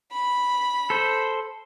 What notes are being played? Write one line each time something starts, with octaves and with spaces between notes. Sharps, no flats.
B5
A4 C5